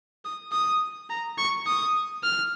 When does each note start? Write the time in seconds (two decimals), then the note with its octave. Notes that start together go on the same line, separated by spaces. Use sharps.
0.25 D#6
0.52 D#6
1.10 A#5
1.38 C#6
1.67 D#6
2.23 F6